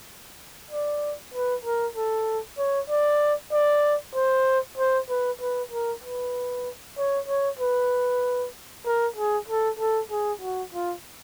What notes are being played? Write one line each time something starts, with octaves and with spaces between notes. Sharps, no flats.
D5
B4
A#4
A4
C#5
D5
D5
C5
C5
B4
B4
A#4
B4
C#5
C#5
B4
A#4
G#4
A4
A4
G#4
F#4
F4